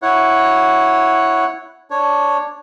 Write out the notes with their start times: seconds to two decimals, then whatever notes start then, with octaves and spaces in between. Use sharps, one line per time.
0.02 E4 C#5 F#5
1.91 D4 C#5